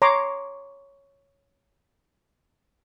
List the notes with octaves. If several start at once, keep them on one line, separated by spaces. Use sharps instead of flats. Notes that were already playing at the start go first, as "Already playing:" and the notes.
C#5 A#5 C6 D6